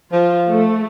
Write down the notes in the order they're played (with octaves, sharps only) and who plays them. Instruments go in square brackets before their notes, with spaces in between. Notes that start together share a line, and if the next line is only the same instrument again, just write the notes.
[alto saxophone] F3 [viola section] F4
[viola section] A3